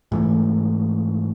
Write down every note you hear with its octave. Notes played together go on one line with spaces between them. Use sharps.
G#2 E3 A3